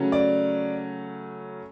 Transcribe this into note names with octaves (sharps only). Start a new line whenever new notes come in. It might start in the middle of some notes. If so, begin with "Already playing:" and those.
Already playing: C#3 F#3 A3 C#4
D5